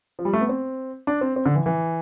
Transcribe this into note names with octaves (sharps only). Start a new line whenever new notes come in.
F3
G3
A3
B3
C4
D4
C4
C4
D3
E3
E3